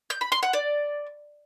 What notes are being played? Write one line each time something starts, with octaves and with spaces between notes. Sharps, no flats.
G6
B5
C6
F#5
D5